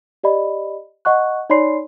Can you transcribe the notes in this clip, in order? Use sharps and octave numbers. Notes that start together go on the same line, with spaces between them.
G4 D5 D#5 B5
D#5 F#5 C#6 F#6
D#4 C#5 D5 B5 C6 C7